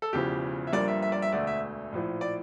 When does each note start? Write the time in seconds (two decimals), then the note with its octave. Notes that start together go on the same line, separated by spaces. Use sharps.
0.02 A4
0.12 E1 E2 C#3 F3 G4
0.67 E5
0.73 G1 G2 F3 A#3 D5
0.88 E5
1.02 E5
1.12 D5
1.22 E5
1.32 E1 D2 D3 A3 D5
1.47 E5
1.92 A#1 A2 F3
2.21 D5